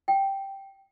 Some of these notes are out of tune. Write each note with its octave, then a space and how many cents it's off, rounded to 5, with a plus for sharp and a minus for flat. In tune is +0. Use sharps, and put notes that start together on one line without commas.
G5 -5